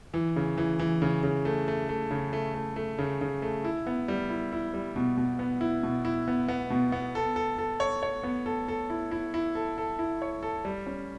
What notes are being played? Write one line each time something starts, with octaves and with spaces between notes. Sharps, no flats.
E3
C#3
E3
E3
C#3
C#3
A3
A3
A3
C#3
A3
A3
A3
C#3
C#3
A3
E4
B3
G3
E4
E4
G3
B2
B2
B3
E4
B2
E4
B3
B3
B2
B3
A4
A4
A4
C#5
C#5
B3
A4
A4
E4
E4
E4
A4
A4
E4
C#5
A4
G3
C#4